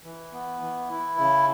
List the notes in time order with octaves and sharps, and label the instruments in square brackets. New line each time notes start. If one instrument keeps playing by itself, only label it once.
[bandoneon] E3
B3
E3
E4
C#3